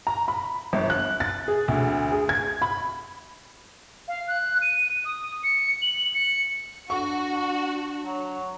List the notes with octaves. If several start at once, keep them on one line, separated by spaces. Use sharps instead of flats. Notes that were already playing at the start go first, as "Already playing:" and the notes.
A#5
B5
G1
F#6
A6
G#4
D2
G#4
G#6
B5
F5
F#6
D#7
D#6
C#7
F#7
C#7
D4 F#4 C#6
F#3